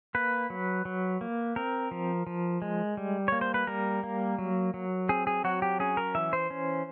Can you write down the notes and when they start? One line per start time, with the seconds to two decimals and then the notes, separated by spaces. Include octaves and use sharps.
0.15 A#3 B4
0.50 F#3
0.85 F#3
1.21 A#3
1.56 C4 A#4
1.91 F3
2.27 F3
2.62 G#3
2.97 G3
3.28 A#3 C#5
3.41 C5
3.54 B4
3.67 G3 A#4
4.03 A#3
4.38 F#3
4.74 F#3
5.09 C4 G#4
5.27 G#4
5.44 F#3 F#4
5.62 G4
5.80 C#4 G#4
5.97 A#4
6.15 E3 E5
6.33 C5
6.50 C#4